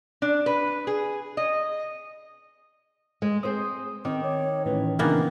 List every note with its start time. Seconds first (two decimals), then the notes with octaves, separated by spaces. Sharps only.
0.22 D4
0.46 B4
0.87 G#4
1.37 D#5
3.22 G#3
3.43 C4 G#4 C5 D#6
4.05 D#3 C4 D6
4.23 C#5
4.65 A2 E3 C#4 B4
4.99 A#2 C#3 E3 A#3 B3 D4 D#4